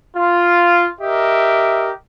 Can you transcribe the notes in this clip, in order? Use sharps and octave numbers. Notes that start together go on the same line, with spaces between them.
F4
G4 A#4 D#5 E5